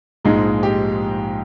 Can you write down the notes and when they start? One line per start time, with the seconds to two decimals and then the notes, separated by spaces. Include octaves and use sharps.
0.24 A#1 G#2 F3 G#3 D#4
0.63 G4